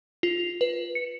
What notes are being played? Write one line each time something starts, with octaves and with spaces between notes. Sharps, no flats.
F4
B4
C#7